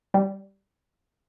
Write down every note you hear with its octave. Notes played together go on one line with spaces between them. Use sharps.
G3